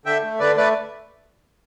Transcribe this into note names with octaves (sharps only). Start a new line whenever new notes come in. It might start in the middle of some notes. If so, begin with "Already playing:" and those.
D3 E5 G5
A3
D3 B4 D5
A3 B4 D5